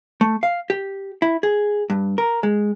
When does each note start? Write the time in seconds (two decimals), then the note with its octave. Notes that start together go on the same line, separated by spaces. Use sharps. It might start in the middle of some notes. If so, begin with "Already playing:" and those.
0.21 A3
0.43 F5
0.70 G4
1.22 E4
1.43 G#4
1.90 G2
2.18 A#4
2.43 G#3